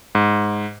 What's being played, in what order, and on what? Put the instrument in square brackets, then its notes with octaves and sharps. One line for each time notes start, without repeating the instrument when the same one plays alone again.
[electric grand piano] G#2